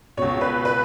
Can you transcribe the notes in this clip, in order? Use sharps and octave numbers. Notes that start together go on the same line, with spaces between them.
C#2 B2 C#5
B4
B4